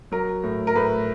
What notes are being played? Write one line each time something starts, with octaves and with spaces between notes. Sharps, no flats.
F#3 A#4
A2
A#4
A2 B4